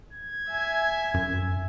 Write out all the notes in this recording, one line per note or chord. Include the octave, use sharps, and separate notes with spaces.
G#6
E5 G#5
F#2